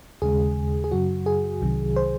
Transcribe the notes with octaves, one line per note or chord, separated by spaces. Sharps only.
D#2 C#3 G#3 G#4
G#4
F#2 C#3 F#3 F#4
G#4
C2 C3 D#3 F#3
C5